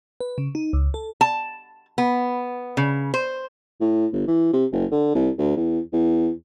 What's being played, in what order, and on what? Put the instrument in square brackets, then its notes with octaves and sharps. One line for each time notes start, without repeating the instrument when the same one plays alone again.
[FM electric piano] B4
C#3
D#4
C#2
A4
[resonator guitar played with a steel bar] A5
B3
C#3
C5
[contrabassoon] A2
G1
E3
C3
F#1
D3
C2
D2
E2
E2